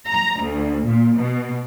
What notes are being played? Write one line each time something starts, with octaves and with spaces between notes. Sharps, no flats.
A#5
D2
A#2
B2